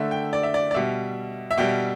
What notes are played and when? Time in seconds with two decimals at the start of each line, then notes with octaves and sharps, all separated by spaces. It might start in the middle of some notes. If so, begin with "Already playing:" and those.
Already playing: D3 A3 E5
0.11 G5
0.33 D5
0.43 E5
0.54 D5
0.71 D5
0.74 B2 G3 E5
1.51 E5
1.58 B2 G3 G5